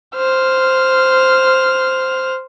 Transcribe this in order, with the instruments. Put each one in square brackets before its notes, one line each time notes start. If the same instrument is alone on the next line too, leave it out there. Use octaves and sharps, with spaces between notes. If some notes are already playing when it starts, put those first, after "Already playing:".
[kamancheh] C5 F6